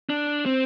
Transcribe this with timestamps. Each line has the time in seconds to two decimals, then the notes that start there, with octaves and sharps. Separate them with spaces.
0.10 D4
0.46 C4